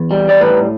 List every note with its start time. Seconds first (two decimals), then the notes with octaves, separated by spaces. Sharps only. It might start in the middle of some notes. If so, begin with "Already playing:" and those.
Already playing: E2
0.11 G3
0.29 D5
0.41 A2 B4